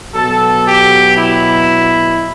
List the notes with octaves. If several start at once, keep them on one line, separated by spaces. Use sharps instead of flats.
B2 F#3 A4
G4
E4